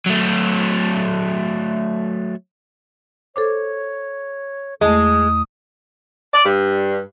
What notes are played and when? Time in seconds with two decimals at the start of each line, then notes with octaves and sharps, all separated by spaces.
0.06 F#3 A3
3.36 A4 C5 C#5 D6
4.81 E2 G#3 A3 D#6
6.33 D5
6.45 G2